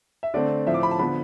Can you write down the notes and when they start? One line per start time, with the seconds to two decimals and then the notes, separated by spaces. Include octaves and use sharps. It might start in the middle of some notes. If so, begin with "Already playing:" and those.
0.23 E5
0.34 D3 A3 C4 D5
0.67 A2 F3 C4 E5
0.74 D6
0.83 B5
0.91 A5
0.99 D3 F3 B3 B5